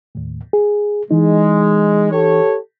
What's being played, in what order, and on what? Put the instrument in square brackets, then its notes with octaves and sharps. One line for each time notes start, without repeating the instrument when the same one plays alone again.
[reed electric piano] D#2 A2
G#4
[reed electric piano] E3 D#4 [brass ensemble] G#3
[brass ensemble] G4 A4 C#5